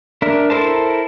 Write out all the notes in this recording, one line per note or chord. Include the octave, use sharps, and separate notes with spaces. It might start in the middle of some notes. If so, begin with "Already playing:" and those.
D4 A#4 E5
E4 A4 A#4 C5 A5